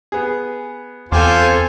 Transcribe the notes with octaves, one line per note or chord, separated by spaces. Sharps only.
B3 G#4
E2 C4 F4 A4 C5 G5 G#5 D6